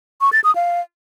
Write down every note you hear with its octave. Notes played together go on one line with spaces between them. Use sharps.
C#6
A6
D#6
F5